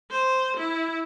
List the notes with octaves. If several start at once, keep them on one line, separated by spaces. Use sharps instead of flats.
C5
E4